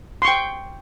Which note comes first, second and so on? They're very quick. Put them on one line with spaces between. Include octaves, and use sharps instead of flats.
C6 C#6 G5